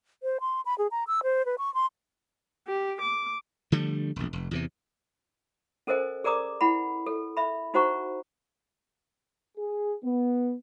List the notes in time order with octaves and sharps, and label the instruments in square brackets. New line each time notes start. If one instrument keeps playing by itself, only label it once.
[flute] C5
C6
B5
G#4
A#5
E6
C5
B4
C#6
C6
[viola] G4
D6
[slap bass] D3 F3 G3 A3
E1 A#1
F1
E2 C3 E3
[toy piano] C#4 A4 A#4 C5 D#5 G#5
G#4 A#4 D5 A#5 D6 D#6
E4 F#5 B5
A4
E5 B5
D#4 F#4 C5 F#5 A#5 C#6
[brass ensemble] G#4
B3